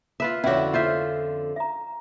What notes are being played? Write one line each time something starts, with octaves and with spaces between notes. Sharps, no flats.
F4 B4 E5
F2 D3 C#4 E4 F#4 C#5
F4 C5 E5
E5 A#5